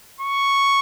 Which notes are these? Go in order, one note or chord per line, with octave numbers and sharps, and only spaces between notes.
C#6